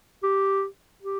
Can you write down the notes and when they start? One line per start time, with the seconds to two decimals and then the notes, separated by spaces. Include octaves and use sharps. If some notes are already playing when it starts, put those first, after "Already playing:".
0.23 G4
1.02 G4